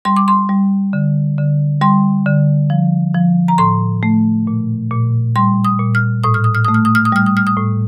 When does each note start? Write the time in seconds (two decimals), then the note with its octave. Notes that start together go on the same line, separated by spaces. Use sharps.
0.05 G3 C6
0.16 D6
0.28 C6
0.49 G3
0.93 D3
1.38 D3
1.81 G3 C6
2.26 D3
2.70 F3
3.14 F3
3.48 A#5
3.58 A2 C6
4.03 A3
4.47 A#2
4.91 A#2
5.36 G3 C6
5.65 D#6
5.80 A#2
5.95 F6
6.24 A2 D#6
6.34 F6
6.44 D#6
6.55 F6
6.65 A3 D#6
6.74 F6
6.85 D#6
6.95 F6
7.05 D#6
7.12 G3 F6
7.26 D#6
7.37 F6
7.47 D#6
7.56 A2